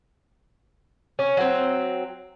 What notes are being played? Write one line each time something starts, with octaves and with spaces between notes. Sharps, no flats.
C#4
F#3 C4